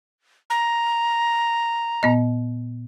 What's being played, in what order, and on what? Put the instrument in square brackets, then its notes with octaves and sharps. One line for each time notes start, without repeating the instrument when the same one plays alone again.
[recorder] A#5
[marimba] A#2 B3 D#5